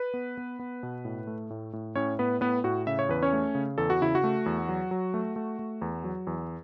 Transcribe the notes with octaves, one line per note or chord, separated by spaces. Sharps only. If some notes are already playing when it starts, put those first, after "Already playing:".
Already playing: B4
B3
B3
B3
B2
A2
A3
A2
A2
A2 C#4 C#5
A2 B3 B4
A2 B3 B4
A2 F#4
C#3 E5
C#5
E2 B4
C#4 C#5
A3
C#3
E2 A4
F#4
C#3 E4
F#4
A3
E2
F#3
F#3
A3
A3
A3
E2
F#3
E2